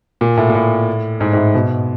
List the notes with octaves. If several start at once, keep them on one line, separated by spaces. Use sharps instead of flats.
A#2
A2
A#2
A2
G#2
G#2
A2
B2